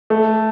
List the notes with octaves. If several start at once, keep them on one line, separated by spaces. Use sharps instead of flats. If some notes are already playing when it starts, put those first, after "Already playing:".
A3